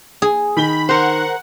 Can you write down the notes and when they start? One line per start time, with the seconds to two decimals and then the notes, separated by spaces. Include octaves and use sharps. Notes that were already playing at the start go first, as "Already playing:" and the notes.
0.22 G#4
0.57 D#3 B5 G7
0.89 A#4 C5 F#5